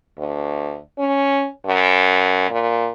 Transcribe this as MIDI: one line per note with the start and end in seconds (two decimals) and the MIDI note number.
0.17 0.77 38
0.99 1.47 61
1.66 2.48 42
2.50 2.89 46